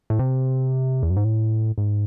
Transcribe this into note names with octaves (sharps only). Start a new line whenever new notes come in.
A2
C3
E2
F#2
G#2
A2
G#2